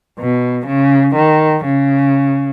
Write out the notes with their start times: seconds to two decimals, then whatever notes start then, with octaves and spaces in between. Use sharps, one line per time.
0.19 B2
0.67 C#3
1.16 D#3
1.65 C#3